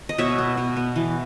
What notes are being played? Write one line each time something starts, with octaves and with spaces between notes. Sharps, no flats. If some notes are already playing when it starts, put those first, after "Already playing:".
D#5
B2 C#5 E5
B3
B2
B3
E3